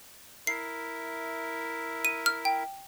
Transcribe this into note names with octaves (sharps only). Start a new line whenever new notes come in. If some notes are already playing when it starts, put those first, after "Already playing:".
E4 A#4 E5 C7
D#7
F6
G5